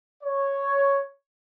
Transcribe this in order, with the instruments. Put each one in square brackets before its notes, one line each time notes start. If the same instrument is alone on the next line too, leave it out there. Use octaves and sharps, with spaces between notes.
[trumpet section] C#5